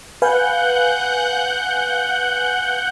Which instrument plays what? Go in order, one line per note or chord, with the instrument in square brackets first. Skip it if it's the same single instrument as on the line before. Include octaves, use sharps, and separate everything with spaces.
[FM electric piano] B4 F5 G#5 [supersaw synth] F#5 F#6 G6